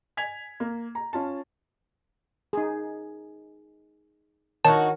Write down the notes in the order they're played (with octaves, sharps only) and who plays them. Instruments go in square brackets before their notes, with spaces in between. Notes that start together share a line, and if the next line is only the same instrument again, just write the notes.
[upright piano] G#5 G#6 B6 F7
A#3
A#5
C#4 F4 A5
[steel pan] D#4 G#4
[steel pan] D#3 A#4 C#5 [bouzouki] D#4 E4 F#4 [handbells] A5